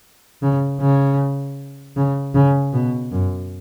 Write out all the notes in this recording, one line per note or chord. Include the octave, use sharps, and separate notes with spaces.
C#3
C#3
C#3
C#3
B2
F#2